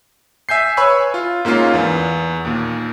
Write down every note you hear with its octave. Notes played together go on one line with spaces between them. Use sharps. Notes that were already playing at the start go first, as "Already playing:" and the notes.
E5 G#5 G6 C7
B4 C#5 G#5 B5 C#6 E6
F4
G#2 A#3 C#4 F4
E2 B3
D#2 A#2